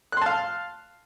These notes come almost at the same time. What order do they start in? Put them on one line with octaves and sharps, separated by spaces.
F#6 C6 A5 F5